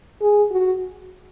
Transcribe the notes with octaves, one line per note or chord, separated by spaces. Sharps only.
G#4
F#4